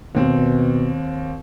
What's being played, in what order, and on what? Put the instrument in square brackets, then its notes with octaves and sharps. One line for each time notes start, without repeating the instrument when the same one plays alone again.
[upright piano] D#2 C4 [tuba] B2